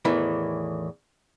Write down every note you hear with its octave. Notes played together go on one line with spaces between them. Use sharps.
E2 A2 D#3 E3